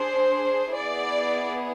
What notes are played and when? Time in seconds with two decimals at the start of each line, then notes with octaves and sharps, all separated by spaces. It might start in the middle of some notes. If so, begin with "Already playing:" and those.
Already playing: D4 G#4 C5
0.75 B3 E4 G#4 D5